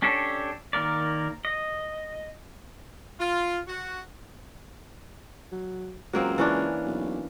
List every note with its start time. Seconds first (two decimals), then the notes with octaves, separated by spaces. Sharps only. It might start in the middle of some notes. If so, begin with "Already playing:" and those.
0.02 C#4 D4 G4 A4 C#5
0.73 D#3 A#3 A#4 D5
1.45 D#5
3.20 F4
3.68 F#4
5.52 F#3
6.13 C#2 F#3 A#3 C4
6.38 E3 C#4 D4
6.86 B1